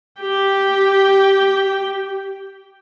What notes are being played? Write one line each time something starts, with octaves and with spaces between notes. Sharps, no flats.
G4 G5